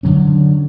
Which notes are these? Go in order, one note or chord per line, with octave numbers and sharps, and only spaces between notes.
D3 F#3 C#4